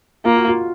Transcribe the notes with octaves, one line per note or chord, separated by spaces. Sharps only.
A#3 F4
F#4
F4